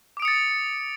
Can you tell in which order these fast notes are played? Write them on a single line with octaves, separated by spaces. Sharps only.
D6 D7 D#6 C#7 A6